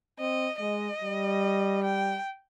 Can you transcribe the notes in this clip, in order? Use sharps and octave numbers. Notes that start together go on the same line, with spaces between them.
C4 D#5
G#3 D#5
G3
G5